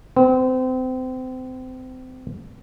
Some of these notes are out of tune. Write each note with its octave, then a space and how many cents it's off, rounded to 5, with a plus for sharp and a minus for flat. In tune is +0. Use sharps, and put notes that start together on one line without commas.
C4 -30